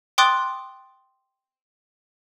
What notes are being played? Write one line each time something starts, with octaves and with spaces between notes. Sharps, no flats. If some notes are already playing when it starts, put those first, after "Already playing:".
G5 C6 D6 D#6 F#6 A6